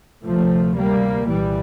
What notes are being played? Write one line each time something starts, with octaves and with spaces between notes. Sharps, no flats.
D2 C3 F3 A3
G3 A#3
C2 A#2 E3 G3